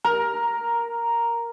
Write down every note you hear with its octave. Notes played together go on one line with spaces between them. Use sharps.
A#4